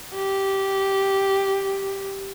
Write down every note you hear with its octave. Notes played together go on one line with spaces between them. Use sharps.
G4